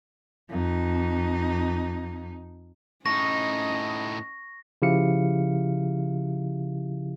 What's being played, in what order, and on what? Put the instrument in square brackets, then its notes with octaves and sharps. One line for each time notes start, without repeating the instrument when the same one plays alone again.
[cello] F2 D#4
[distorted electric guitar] A2 D#4 [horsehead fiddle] C#4 D#5 [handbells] C#6 [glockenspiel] A#6
[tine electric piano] C#3 F3 E4 G4 F5 C#7